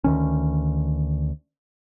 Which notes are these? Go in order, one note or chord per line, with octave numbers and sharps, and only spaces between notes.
D2 D#3 C#4